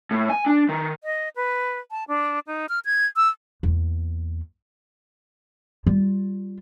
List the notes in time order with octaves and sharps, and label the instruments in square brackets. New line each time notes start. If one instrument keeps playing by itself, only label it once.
[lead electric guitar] A2
G#5
D4
D#3
[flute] D#5
B4
A5
D4
D#4
F6
G#6
E6
[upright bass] E2 A#3
G3 F4